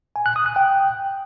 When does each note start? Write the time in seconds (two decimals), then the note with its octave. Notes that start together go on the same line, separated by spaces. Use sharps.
0.16 G#5
0.26 F#6
0.36 D#6
0.46 F#6
0.56 G5